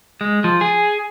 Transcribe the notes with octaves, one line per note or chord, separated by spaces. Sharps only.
G#3
F3
G#4